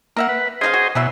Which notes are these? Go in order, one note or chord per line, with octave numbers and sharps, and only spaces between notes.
A#3 A#4 E5 F#5
B4
C#3 F4 G#4 C5 D#5 F5
F#4
B2 E3 F#3 E5